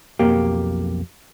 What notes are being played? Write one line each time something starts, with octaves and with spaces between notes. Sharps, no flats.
B1 F2 A#3 G4